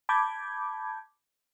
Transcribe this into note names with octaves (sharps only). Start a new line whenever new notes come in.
A5 B5 D6 G6 G#6